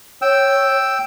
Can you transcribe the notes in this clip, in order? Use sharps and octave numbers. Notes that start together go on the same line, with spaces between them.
C#5 G5 E6